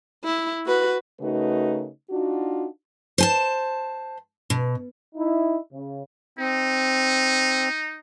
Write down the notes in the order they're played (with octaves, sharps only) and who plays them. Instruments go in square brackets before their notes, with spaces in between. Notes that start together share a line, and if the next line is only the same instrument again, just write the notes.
[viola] E4
F#4 B4
[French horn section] C#3 A3 D#4 F#4 A#4 B4
D4 D#4 F4 F#4
[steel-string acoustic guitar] C5 G#5 A5
B2
[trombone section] D#4 E4
C#3
[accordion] C4 [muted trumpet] D#4